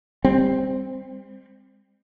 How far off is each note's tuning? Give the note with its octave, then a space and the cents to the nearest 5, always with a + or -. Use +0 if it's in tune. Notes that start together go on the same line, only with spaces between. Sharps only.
G3 +35 C4 +0